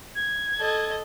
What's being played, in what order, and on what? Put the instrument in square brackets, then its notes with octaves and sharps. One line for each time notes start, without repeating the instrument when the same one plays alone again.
[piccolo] G#6
[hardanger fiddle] A4 D#5